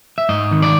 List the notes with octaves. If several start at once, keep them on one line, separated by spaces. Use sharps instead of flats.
E5
G#2 D#5
D#3
D5